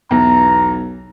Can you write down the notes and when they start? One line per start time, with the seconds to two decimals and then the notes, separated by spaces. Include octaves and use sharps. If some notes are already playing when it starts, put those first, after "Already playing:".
0.11 B1 E2 A#5